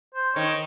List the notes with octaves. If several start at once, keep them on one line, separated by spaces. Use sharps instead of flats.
C5
D#3 C#5